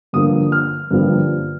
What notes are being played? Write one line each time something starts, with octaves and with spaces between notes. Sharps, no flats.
G2 D3 F3 A#3 D#6
F6
G2 D3 F3 A#3